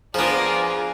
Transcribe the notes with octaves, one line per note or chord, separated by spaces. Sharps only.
F3 A#3 B3 D4 F4 G#4 G#5 A#5